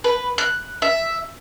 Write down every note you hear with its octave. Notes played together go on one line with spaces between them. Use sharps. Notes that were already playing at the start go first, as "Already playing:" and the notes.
B4
F#6
E5